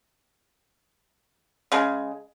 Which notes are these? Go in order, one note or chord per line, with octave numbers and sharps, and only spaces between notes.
C#3 G#3